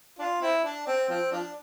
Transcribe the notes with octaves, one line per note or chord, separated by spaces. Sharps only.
D4 F4
C4 E4
D4
C4
F3 C4
F3 D4